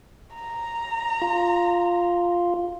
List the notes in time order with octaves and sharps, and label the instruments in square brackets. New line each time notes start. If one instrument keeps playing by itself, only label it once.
[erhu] A#5
[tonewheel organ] F4